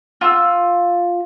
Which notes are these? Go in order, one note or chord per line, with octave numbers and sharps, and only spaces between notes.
F4 E6